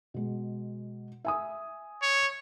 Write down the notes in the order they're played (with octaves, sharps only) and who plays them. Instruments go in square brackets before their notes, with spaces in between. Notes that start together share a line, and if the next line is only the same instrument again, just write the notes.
[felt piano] B2 G#3
E5 G#5 D#6
[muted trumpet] C#5